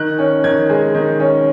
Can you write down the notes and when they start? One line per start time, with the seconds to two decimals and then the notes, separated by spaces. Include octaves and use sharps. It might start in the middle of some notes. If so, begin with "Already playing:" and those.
Already playing: D#3 F#6
0.19 C#4
0.44 D#3 G#6
0.69 G#3
0.95 D#3
1.20 C#4